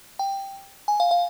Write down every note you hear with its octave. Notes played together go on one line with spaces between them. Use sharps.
G5
G#5
F5
F5